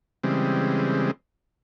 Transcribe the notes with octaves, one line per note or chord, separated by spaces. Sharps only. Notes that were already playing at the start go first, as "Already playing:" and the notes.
C#3 E3 G3 G#3 C4